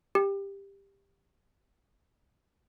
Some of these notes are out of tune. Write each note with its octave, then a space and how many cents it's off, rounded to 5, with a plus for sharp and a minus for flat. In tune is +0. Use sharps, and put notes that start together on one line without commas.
G4 +15